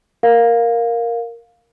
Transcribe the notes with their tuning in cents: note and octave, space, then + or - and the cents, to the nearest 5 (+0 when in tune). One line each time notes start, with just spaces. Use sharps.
A#4 +0 F5 +10